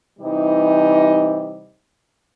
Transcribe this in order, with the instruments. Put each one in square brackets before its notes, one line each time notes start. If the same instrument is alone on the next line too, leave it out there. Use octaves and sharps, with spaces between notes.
[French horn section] C3 E3 G3 D#4